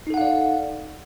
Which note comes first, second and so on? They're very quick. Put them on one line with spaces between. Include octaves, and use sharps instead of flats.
D#4 A4 F#5 F5 D5